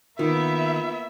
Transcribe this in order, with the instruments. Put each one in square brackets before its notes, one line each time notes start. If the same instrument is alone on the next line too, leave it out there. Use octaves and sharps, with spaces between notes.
[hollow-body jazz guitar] D#3 [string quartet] A#3 B3 E4 [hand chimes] F4 [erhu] E5